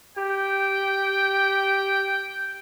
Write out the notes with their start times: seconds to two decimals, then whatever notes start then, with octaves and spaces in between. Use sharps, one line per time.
0.17 G4 G5